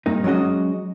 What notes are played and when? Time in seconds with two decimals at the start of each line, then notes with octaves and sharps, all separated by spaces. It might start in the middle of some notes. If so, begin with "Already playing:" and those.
0.06 G2 A#3 D#4
0.24 F#3 G#3 C#4 F#4 D#5